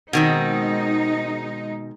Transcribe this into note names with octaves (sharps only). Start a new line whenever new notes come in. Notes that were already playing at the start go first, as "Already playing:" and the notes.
B2 D#3 G#3 C4 D#4